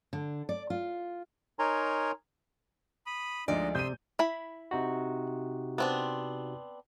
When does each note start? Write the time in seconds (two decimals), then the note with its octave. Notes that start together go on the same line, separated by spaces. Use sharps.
0.13 D3
0.49 D5
0.70 F4
1.59 D#4 A#4 C#5 G#5 A#5 C6
3.06 B5 D#6
3.48 D2 F3 G#3 D4 D#4 D5 D#5
3.75 C3 C6 D#6 E6 G6 D#7
4.19 E4 B5
4.71 C3 D#4 F#4
5.78 B3 C4 D4